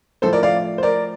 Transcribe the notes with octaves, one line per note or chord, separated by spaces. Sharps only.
A2 F3 A4 C5
A#4 D5
D5 F5
C5
A#4 D5